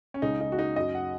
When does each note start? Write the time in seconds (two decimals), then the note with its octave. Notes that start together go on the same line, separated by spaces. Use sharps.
0.14 C#4
0.22 C#2 C#3 G#3 D#4
0.41 D#4
0.52 F#4
0.59 D#4
0.76 F#2 F#3 D#5
0.95 F#5